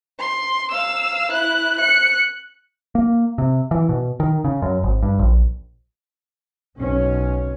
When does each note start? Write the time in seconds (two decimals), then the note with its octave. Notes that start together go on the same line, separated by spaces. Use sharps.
0.19 C6
0.71 F5 E6
1.32 E4 F#6
1.79 F#6 C#7
2.95 A#3
3.38 C3
3.71 E3
3.89 B2
4.20 D#3
4.44 C#3
4.62 F#2
4.83 G#1
5.03 G2
5.19 A#1
6.78 B1 C#4